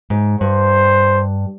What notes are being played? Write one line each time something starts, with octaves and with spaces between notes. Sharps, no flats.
G#2
G2 C5